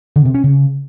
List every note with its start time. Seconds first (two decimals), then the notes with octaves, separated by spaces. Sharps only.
0.16 D3
0.25 C3
0.34 C#4
0.44 C#3